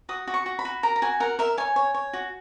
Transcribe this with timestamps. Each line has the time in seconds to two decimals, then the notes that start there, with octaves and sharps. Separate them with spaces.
0.09 F#4 D#6
0.27 F#4
0.34 C#6
0.46 F#4
0.59 B5
0.65 F#4
0.83 A#4 A#5
0.96 A#5
1.02 F#4 G#5
1.20 A#4 F#5
1.39 A#4 E5
1.57 C#5 G#5
1.76 C#5
1.95 C#5
2.13 F#4